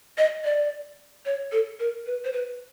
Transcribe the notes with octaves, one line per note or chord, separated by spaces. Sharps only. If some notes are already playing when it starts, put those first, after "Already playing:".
D#5
D5
C#5
A4
A#4
B4
C5
B4